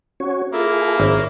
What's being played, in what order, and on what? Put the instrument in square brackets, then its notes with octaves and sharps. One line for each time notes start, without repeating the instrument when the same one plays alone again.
[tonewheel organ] C#4 F#4 C#5
[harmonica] A#3 E4 [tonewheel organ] F4 G#4 A4
[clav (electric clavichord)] G#1 [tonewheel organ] C#5